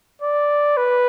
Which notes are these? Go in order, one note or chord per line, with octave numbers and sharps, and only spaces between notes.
D5
B4